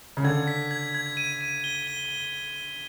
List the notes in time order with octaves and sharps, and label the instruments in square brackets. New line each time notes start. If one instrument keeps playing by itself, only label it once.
[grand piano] C#3
[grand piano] D3 [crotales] G#6
[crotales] B6
G#6
G#6
D#7
D#7
G7
G7